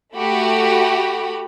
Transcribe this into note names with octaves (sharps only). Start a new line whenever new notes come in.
A3 F#4 G4 B5